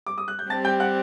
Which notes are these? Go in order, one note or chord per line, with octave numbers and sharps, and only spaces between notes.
D6
D#6
F#6
G6
G3 C4 G4 A5 A6
G5 G6
F#5 F#6